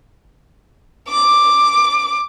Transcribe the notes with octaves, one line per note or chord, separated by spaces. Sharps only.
D6